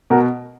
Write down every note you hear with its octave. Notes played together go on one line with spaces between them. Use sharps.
B2 F#4 A#4